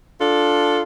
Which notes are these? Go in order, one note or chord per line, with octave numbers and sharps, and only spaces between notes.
D4 F4 A4